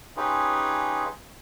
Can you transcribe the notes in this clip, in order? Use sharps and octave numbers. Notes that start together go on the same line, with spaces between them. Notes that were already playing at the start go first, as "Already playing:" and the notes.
C#4 D#4 F4 G4 G#4 B4